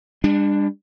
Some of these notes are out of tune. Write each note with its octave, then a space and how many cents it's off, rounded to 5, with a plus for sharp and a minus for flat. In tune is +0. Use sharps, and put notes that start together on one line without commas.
G3 +45 D4 +5